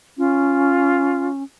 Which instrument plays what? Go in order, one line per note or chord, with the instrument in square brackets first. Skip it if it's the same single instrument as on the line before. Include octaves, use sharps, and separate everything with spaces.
[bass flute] C#4 [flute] F4